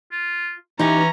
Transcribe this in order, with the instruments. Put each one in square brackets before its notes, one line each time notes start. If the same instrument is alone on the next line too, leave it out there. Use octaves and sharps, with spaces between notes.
[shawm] F4
[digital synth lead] E3 [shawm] C#4 [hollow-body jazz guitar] D#4 G4 [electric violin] A#5